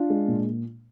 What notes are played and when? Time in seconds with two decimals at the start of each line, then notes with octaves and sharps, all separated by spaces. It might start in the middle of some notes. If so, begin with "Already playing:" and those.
Already playing: D4 F4
0.10 G#3
0.28 A#2